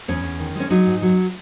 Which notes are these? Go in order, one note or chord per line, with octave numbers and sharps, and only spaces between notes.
E2 C#4
E2
D#3
G#3 C#4
F#3 D#4
G#2
F#3